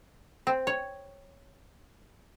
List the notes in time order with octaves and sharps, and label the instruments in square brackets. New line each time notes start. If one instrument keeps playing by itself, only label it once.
[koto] C4
C#5